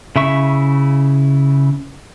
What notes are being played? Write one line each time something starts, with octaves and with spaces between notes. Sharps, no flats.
C#3 E4 E5 C#6